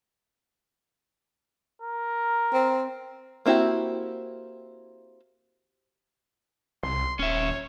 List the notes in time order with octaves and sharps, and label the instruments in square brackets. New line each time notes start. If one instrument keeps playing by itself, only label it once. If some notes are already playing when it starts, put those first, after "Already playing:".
[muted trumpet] A#4
[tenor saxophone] C4
[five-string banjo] A#3 C4 E4 F#4 G4
[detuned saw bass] C2 [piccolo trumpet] C6
[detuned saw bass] D#1 [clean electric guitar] C#4 E5 [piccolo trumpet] C#5